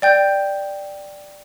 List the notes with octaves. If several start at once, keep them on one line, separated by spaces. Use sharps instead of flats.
D5 G5 G6